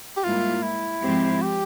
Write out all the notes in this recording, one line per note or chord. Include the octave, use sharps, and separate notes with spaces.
G4
G#2 G3 A#3 E4 F4
E4
G#2 F3 C4 G4
G4